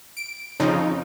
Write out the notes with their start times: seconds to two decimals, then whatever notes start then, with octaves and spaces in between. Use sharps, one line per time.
0.17 D7
0.60 F2 C#3 F3 D#4